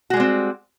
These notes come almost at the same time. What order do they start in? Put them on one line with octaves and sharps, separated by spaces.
F#4 G#3 G3 C4